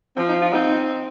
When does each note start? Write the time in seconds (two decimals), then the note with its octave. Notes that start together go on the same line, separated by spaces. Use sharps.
0.16 F3 C4
0.28 D#4
0.41 F4
0.54 C4 D#4